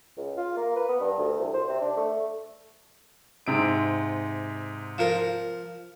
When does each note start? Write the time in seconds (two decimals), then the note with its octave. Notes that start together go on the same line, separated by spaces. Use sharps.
0.17 C#2
0.37 F4
0.57 A#3
0.76 B4
0.88 B3
1.00 G2
1.18 D2
1.40 C2
1.54 C5
1.69 C3
1.81 D4
1.97 A3
3.47 G#2 C3 D7
4.98 F3 A#4